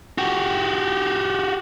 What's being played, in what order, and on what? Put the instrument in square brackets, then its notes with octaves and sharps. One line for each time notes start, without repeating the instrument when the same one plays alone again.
[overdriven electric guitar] F#4 G4